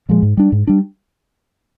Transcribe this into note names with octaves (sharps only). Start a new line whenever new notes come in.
A#2 F3 G#3
G#2
G3 D4
G#2
G3 D4